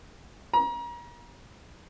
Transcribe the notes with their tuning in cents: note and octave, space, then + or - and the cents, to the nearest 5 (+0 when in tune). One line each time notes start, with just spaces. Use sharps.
A#5 +35